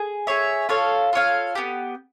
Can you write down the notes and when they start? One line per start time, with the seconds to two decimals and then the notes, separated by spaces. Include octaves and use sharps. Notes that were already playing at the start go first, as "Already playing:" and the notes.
Already playing: G#4
0.27 G#4 C#5 E5
0.69 F4 A4 C#5 F5
1.13 F4 A4 C#5 F5
1.55 B3 D4 G4